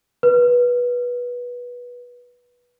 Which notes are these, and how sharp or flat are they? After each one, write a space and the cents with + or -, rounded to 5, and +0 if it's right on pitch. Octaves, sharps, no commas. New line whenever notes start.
B4 -15